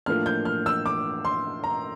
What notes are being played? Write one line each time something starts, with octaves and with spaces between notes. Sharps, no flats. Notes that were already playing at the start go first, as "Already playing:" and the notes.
A2 F3 A#3 D4 F6
G6
F6
E6
D6
C6
A#5